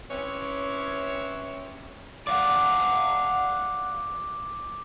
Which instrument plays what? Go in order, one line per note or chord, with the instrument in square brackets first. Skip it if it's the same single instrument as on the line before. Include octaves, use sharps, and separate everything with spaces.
[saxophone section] C4 C#4 E4 G4 B4 C#5
[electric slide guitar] D5 F5 F#5 [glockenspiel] D6